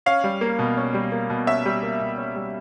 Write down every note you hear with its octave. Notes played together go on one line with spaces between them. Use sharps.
C#4 F5
G3
A#3
B2
C#4
G3
A#3
B2
C#4 E5
G3
A#3
B2
C#4
G3